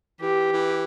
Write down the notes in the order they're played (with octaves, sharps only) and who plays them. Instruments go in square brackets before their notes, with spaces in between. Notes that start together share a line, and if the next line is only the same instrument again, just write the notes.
[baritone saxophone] E3 [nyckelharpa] G4
[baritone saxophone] E3